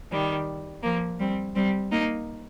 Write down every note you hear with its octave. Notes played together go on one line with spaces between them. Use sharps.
D#3 G3
F3 A#3
G3 C4
G3 C4
A#3 D#4